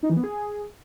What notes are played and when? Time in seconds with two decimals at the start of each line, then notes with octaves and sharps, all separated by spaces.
0.03 D#4
0.10 E3
0.17 B3
0.24 G#4